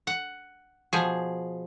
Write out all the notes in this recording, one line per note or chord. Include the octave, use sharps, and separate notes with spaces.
F#5
B2 F3 G#4